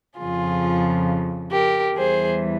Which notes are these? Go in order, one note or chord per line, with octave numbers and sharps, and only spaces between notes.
F2 C#3 F3 F4 G#4
G4 A#4
E2 E3 G3 G#4 C5